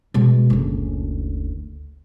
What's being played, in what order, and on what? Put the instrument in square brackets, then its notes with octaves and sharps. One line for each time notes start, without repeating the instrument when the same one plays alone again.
[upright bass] B2 G#3
F#1 D2